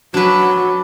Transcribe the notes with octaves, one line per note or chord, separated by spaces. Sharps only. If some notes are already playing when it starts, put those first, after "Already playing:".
F#3 D4 F#4 B4